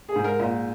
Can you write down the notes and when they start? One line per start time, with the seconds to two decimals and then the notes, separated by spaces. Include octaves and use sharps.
0.09 G#4
0.16 G#2
0.24 A#4
0.39 A#2